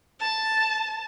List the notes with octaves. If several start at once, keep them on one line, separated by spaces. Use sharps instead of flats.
A5